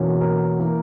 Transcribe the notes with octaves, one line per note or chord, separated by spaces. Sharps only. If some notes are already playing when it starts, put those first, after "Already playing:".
Already playing: E2 B2 A#3 C#4
A#4
E3 A#3